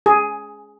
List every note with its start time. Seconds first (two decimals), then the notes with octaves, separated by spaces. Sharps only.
0.06 G#4